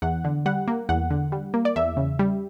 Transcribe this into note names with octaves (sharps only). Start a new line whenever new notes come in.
E2 F#5
D3
G3 F#5
A#3
E2 F#5
D3
G3
A#3
D5
E2 E5
C#3
G3